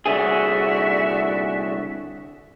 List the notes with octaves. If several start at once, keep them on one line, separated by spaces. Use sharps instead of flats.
C2 D3 F#4 G#4 D5 E5